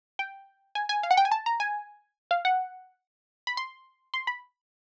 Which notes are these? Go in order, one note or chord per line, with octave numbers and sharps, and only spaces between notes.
G5
G#5
G#5
F5
F#5
G5
G#5
A5
A#5
G#5
F5
F#5
B5
C6
C6
B5